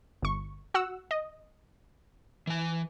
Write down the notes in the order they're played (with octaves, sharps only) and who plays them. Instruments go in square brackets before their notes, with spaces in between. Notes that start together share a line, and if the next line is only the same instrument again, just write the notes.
[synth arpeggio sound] G1 C#6
F#4 F#5 E6
D#5
[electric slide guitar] E3 G#5